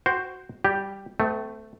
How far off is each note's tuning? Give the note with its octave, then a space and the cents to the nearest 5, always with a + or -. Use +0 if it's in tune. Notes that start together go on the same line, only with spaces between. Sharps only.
F#4 +0 C5 +0 G5 -20
G3 +0 G4 +0
A3 +0 C4 -45